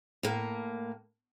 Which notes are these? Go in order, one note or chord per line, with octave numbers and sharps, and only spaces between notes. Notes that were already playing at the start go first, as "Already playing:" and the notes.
A2 A#3